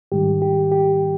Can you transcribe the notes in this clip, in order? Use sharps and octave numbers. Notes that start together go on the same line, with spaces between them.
G#2 D#3 G3 G4
G4
G4